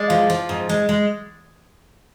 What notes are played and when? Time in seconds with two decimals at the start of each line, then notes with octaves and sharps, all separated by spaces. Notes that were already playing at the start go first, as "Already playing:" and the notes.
Already playing: G#3 D5
0.10 F3
0.30 F3
0.49 G#2
0.69 G#3
0.89 G#3